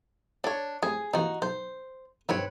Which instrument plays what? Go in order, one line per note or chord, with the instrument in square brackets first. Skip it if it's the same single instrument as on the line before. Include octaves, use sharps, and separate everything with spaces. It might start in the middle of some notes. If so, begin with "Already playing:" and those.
[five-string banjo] D4 C#5 [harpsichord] A4 C5
[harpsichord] A2 G3 C4 [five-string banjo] G#4
[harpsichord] C3 E3 A#3 [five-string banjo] D#4 F#4
[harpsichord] B1 [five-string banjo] C5
[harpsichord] B1 G2 D#3 [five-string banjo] C4 B4 C#5